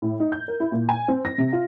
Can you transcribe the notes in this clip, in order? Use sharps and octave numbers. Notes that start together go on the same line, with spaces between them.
A2
D#4
G6
A#4
E4
A#2
G#5
C4
A#6
C3
F4